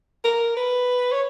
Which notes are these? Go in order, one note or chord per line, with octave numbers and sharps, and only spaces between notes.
A#4
B4
C#5